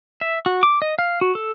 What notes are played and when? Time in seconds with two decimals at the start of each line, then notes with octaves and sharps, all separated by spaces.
0.21 E5
0.46 F#4
0.63 D6
0.82 D#5
0.99 F5
1.21 F#4
1.35 A4